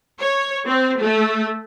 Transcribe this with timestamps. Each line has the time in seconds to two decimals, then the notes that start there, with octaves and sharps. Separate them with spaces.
0.20 C#5
0.67 C4
1.00 A3